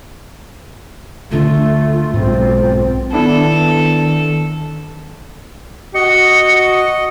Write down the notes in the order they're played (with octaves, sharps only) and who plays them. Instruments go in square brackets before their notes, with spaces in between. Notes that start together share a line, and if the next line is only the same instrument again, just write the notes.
[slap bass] D2 D3 D4 [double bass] A3 [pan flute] F4
[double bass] B1 C4 [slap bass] G#2 G#3
[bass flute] D#3 [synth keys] B3 D4 E4 [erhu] A4
[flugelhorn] F#4 [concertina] D#5 [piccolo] C#7